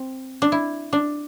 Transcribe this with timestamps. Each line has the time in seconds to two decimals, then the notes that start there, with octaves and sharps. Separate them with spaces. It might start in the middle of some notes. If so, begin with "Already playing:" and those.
Already playing: C4
0.42 D4
0.52 E4
0.93 D4